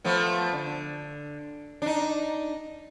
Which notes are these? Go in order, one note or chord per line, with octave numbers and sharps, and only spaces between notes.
F3 A3 B3
D3
D4 D#4